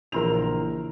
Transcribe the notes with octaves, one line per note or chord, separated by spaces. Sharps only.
A#1 C#3 E3 E4 A#4 C6 F7